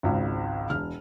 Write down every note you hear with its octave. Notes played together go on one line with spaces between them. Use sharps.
G#1 C#2 G#2
E1 F6